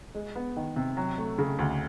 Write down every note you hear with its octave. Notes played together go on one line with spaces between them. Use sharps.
G#3
B3
D#3
C3
F#3
A3
C#3
D2